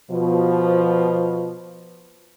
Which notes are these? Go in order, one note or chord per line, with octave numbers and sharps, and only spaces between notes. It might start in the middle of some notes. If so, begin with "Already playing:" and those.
B2 F3